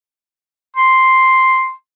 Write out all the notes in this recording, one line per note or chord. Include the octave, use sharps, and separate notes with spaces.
C6